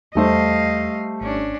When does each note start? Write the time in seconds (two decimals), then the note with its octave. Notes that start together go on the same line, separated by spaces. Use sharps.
0.15 E2 G3 A3 C5 D#5 F5
1.21 G#1 C#4 D4